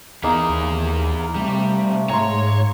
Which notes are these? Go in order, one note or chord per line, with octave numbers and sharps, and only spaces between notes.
E2 E3 A#3 D#4 G#4
D#2
C3 G3 A3
G#2 C#5 A#5 C6